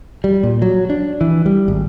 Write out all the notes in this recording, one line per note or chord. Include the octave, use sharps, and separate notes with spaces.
G3
A#2
F#3
D4
E3
G3
G#1